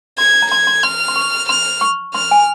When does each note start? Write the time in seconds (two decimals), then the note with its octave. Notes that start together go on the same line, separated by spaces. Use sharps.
0.18 C6 G#6
0.42 A#5
0.51 C6 G#6
0.67 C6
0.83 C6 F6
1.08 C6
1.16 C#6
1.49 C6 F6
1.81 C#6
2.14 C6 F6
2.31 G#5